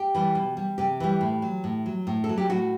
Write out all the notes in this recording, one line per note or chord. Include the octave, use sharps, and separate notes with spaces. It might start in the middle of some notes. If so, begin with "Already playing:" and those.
Already playing: G4
E3 G3
B2
G3
C3 G4
E3 G3
A2
F#3
A2
F#3
A2
A4
F#3
G4
A2 F#4